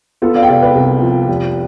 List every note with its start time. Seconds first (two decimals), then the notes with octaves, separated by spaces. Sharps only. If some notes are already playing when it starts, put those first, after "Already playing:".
0.22 B3 F4 A4
0.35 D5 F5
0.43 G5
0.49 C3 D5 F5
0.62 B4 D5
0.75 C2
1.02 F3
1.28 F1